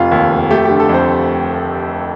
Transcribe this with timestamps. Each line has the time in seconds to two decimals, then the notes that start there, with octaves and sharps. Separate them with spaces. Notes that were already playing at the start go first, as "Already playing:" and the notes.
Already playing: F1 F4
0.11 D#2
0.31 F1
0.51 A3 G4
0.65 D3 G4
0.80 A4
0.89 F2 C5